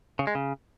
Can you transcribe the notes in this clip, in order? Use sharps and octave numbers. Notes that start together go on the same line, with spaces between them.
C#3
G#3
C#3